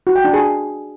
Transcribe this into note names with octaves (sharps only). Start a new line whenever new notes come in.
F#4
G5
D4
G#4